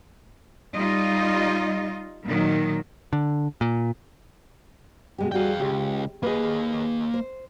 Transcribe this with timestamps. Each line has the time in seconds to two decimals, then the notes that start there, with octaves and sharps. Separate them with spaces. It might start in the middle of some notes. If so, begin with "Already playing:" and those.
0.74 G3 D#4 F4 D#5
2.26 A#2 D#3 F#3
3.13 D3
3.61 A#2
5.18 B2 G#3 G4
5.32 G3 F#4 G#4 F5 G5
5.60 C#2 G4
6.23 A#3 G#4 B4 D#5
7.14 C5